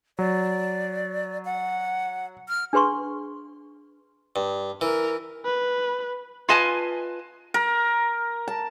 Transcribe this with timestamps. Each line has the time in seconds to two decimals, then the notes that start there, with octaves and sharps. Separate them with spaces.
0.19 F#3 D5
1.45 F#5
2.49 F6
2.73 D4 G#4 B4 C6 C#6
4.36 G2
4.81 E3 A#4
5.45 B4
6.49 F4 B4 D#5 G#5 A5
7.54 A#4
8.48 A5